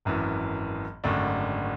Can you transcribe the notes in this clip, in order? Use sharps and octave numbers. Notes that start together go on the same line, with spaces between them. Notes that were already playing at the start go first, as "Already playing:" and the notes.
G#1 F#2 E3
G#1 F#2 D3 A3 D4